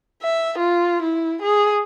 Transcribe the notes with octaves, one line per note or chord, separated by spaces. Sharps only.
E5
F4
E4
G#4